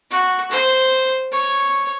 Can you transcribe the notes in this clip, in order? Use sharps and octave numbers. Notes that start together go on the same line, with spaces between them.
F#4
C5
C#5